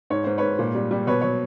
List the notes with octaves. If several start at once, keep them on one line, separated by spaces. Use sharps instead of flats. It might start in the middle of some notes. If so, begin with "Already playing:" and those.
G#2 C#5
G#2 C5
G#2 B4 C#5
A#2
G3
G3
B2 B4 C#5
F#3 C#5